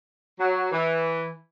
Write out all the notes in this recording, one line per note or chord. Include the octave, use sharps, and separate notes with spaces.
F#3
E3